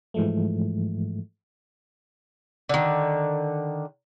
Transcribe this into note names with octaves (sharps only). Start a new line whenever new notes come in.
G#2 E3 F3 G#3 A3
D3 D#3